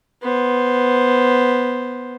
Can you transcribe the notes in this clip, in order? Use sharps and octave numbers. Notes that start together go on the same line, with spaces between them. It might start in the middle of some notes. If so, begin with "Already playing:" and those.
B3 C5